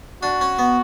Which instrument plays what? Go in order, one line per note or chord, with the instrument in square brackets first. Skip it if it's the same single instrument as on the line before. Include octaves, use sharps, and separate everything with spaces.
[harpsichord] D4 [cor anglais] F#4
[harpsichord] C#4
B3